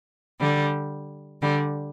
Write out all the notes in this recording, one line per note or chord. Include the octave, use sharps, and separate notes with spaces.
D3 G3
D3 G3